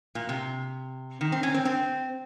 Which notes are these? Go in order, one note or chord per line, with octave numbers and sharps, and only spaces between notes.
A#2
C3
D#3
C4
C#4
C4
C4